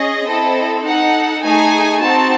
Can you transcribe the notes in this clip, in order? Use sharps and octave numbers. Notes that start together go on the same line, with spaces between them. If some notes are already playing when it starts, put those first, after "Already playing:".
Already playing: C#4 G#4 D#5
C4 E4 A4
D#4 F#5
A4
A3 D#4 G#4 G#5
C4 D#4 F#4 A5